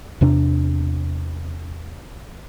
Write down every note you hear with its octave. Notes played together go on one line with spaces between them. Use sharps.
E2 C3 D4